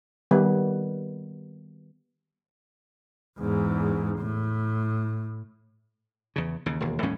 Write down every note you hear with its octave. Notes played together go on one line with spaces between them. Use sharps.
D#3 G3 B3 B4
E2 G#2
A2
E2 C#3
D#2 C#3
E1 D#2
D#2 A2 G3 C#4